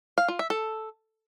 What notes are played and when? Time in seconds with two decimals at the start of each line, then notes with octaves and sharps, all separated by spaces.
0.18 F5
0.28 F4
0.39 E5
0.50 A4